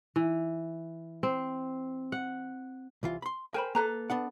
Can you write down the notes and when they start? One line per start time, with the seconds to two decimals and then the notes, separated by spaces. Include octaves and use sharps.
0.16 E3
1.23 C4
2.12 F#5
3.03 C2 E3 F4
3.22 B5 C6
3.54 A#4 C5 G5 G#5 B5
3.75 A#3 A4 B4 A#5
4.10 B3 D4 F#5